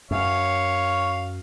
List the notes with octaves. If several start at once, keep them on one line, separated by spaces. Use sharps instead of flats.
F#2 C#5 F5